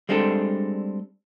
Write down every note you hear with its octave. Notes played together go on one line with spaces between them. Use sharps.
G3 G#3 C4 D4 A4